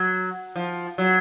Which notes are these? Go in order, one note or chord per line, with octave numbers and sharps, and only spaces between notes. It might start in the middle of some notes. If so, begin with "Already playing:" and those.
Already playing: F#3
F3
F#3